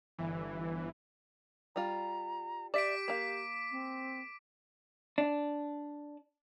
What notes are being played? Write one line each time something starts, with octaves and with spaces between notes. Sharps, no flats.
G1 E3
G3 F4 A#5
G4 D5 E5 D6 B6 D7
A#3 F5
C4
D4